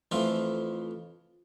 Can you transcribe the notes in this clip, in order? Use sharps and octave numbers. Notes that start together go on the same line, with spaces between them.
F2 E3 F3 A3 F4 F5